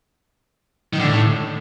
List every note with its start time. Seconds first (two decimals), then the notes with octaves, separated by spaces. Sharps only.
0.93 D#3
0.99 D3
1.06 A2